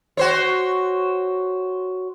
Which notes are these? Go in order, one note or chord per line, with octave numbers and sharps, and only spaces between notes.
F#4 C5 C#5